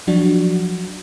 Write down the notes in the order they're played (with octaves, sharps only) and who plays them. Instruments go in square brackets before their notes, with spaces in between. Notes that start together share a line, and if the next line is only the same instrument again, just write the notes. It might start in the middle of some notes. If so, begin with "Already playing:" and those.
[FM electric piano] F3 F#3 D4 F#4